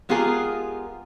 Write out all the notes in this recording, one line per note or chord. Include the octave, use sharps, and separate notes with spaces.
G#3 B3 F4 G4 G#4 A#4